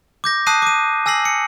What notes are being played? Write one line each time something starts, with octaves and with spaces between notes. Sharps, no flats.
D6 G6 A#6
A5 D#6 F#6 C7 D#7
D6 D#7
G#5 E6 A#6 C7 F#7
C#7